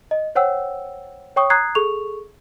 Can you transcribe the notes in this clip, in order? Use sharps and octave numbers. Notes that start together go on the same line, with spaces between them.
D#5
C5 C#5 F#5 G5 E6
C#5 G5 C#6 D#6
A#5 D#6 F#6 G#6 C7
G#4 A4 C#6 F7